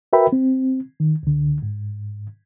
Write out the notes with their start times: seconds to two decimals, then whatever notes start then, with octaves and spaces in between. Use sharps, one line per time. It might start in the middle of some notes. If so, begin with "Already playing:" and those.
0.13 F#4 A#4 B4 E5 G5 B5
0.32 C4
1.00 D#3
1.23 C#2 D3
1.62 G#2